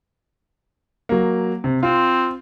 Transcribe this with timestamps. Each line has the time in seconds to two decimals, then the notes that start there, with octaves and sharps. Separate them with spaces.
1.09 F#3 A#3
1.64 C3
1.83 C4 F4